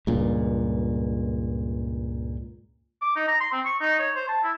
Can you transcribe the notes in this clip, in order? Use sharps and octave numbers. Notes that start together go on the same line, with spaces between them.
C#2 G2 A#2
D6
D#4
A#5
C6
C4
C#6
D#4
C#5
C5
A5
E4